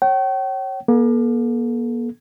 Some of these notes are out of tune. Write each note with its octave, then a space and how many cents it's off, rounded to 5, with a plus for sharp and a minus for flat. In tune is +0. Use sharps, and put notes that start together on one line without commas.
C#5 -20 G5 -40
A#3 +40 A4 -30